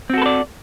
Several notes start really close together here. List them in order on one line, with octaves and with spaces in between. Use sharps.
C4 F#4 A4 B4 D5